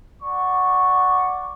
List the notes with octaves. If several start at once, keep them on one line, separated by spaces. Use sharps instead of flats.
D5 F#5 C#6